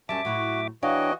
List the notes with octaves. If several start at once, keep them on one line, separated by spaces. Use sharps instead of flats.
F#2 F#3 G3 C#4 E5 A5 D6
A2 F#3 E4 F#4
E3 D4 F#4 C#5 D#5 F5 G5